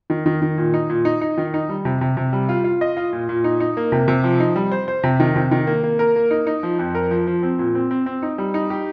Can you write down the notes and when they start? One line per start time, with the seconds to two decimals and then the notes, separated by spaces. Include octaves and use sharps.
0.10 D#3
0.26 D#3
0.42 D#3
0.58 A#2
0.74 D#4
0.89 A#2
1.05 D#4
1.21 D#4
1.38 D#3
1.54 D#4
1.69 G3
1.85 C3
2.01 C3
2.17 C3
2.33 G3
2.49 F4
2.64 F4
2.81 D#5
2.97 F4
3.13 A#2
3.29 A#2
3.44 D#4
3.60 D#4
3.77 A#3
3.92 C3
4.08 C3
4.24 F3
4.40 D#4
4.56 G3
4.72 C5
4.88 C5
5.03 C3
5.20 D#3
5.36 C3
5.51 D#3
5.67 A#3
5.83 A#3
5.99 A#4
6.16 A#3
6.31 D#4
6.47 D#4
6.63 F3
6.79 F2
6.95 A#4
7.11 F3
7.27 F3
7.43 C4
7.59 A#2
7.75 C4
7.91 C4
8.06 C4
8.22 D#4
8.38 G3
8.54 D#4
8.70 G4